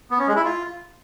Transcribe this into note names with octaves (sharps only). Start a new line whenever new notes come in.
B3
C#4
G#3
E4
F4